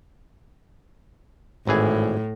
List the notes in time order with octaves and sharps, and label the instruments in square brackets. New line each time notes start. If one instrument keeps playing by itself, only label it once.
[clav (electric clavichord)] G#1 E3 G#4 [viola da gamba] A2